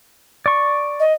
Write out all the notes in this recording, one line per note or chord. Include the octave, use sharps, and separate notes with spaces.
D5 C#6
D#5